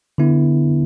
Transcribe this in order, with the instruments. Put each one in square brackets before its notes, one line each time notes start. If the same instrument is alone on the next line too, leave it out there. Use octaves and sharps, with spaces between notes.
[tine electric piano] D3 B3 E4